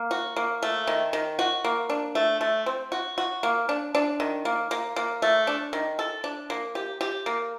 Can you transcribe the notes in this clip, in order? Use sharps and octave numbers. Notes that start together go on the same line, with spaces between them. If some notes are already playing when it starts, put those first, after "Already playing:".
Already playing: A#3
F#4
A#3
A3
D#3
D#3
F#4
A#3
D4
A3
A3
C4
F#4
F#4
A#3
D4
D4
D#3
A#3
A#3
A#3
A3
D4
D#3
A4
D4
A#3
G4
G4
A#3